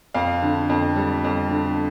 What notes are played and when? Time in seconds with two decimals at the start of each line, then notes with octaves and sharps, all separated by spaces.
0.14 F2 F5
0.42 D3
0.70 F2
0.96 G3
1.24 F2
1.51 D3